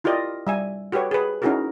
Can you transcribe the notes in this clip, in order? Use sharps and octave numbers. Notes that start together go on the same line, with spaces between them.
E4 F4 G4 A#4 D5 D#5
G3 E5 G#5
F#4 G4 A4 B4 C#5
G#4 B4
C#4 D#4 E4 F#4 G#4 A#4